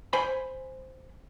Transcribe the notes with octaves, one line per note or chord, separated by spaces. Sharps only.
C5 G#5 B5